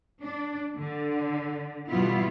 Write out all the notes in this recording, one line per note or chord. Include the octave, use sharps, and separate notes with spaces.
D4
D3
B2 E3 G3 B3 E4 F4